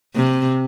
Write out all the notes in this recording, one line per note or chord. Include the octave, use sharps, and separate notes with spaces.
C3